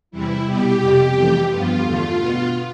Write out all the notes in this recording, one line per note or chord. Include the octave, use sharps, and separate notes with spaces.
E2 C3 E3 G3 E4
B2 G3 B3 G4
F2 C3 G3
F2 E3 A3
G2 F3 B3 F4
E2 D3 A3 F4
B2 B3